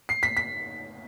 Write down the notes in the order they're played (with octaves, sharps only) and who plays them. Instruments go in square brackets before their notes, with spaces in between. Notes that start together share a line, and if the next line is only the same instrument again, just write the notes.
[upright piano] C7
B6
B6